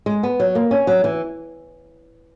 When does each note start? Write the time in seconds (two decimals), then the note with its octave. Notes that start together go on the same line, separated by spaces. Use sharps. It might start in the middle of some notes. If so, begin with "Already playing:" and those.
0.06 G#3
0.23 B3
0.40 F#3
0.55 A#3
0.71 C#4
0.87 F#3
1.04 E3